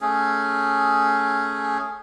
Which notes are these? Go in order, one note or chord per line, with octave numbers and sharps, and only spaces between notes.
A3 C#4 G#4